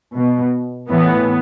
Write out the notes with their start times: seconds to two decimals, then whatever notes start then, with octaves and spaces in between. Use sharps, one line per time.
0.15 B2
0.90 A2 E3 B3